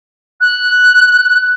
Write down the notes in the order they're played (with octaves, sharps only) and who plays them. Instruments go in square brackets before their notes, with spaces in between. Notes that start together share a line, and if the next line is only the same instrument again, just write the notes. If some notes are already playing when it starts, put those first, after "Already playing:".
[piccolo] F#6